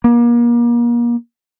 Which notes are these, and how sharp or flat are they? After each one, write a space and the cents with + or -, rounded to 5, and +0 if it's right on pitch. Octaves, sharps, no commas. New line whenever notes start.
A#3 +35